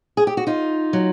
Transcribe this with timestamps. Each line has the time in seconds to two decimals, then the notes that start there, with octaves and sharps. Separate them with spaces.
0.17 G#4
0.27 G4
0.37 F#4
0.47 D#4 F4
0.93 F#3